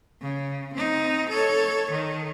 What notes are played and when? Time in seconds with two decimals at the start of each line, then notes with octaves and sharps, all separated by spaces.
0.21 C#3
0.73 C4 D#4
1.29 A4 C#5
1.91 D#3